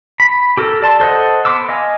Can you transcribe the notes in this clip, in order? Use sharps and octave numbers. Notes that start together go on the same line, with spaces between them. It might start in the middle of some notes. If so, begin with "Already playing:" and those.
B5
G4 A4 A#4
D5 A5 C6
A4 C5 D#5 F#5
B3 C6 D6 E6
D#5 F5 G#5